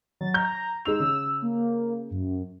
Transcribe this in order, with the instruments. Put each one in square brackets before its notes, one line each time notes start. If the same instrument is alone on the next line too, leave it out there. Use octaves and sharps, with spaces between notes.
[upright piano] F#3 [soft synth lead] A6
[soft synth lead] A#5 [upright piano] G6
[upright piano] G#3 D#4 F7 [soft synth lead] E6
[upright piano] C#3
[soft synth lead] A#3
F#2